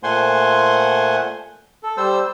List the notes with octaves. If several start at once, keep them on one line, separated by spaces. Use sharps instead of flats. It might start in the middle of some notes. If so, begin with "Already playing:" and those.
A#2 A3 C5 F#5 G#5 C6
A4
G3 C5 E6